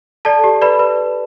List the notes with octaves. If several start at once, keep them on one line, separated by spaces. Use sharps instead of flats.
A4 D5 A5
G4
B4 D5 B5
B4